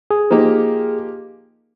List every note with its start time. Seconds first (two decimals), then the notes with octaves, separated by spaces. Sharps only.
0.11 G#4
0.30 F3 A#3 D#4 G4